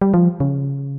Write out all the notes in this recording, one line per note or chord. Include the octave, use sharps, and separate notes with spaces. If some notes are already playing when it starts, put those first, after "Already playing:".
G3
F3
C#3